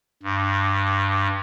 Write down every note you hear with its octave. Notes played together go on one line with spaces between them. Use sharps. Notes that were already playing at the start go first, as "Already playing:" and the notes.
G2